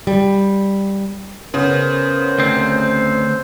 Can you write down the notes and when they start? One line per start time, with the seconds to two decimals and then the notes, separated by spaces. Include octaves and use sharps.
0.07 G3
1.54 C#3 B3 A#4 C5
2.38 D2 C4